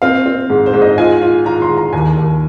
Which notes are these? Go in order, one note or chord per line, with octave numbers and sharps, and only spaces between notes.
C4 F5
C4
G#2
C5
G#2
D#5
F4 G#5
F4
F4 A#5
C6
G#2
A#5
D#2 G#5
D#2